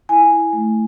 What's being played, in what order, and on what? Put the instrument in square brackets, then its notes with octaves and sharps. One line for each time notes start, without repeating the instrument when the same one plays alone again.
[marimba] E4 G#5
A3